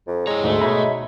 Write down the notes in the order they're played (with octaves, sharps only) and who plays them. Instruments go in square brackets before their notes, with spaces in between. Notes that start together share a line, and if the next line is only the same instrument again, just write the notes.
[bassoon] F2
[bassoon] G#3 [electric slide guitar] E4 C#5 [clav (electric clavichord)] A#5
[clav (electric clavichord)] D2 G#2 [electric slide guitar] A3
[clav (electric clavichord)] B2 D#4 [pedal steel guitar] C#5 E5 B5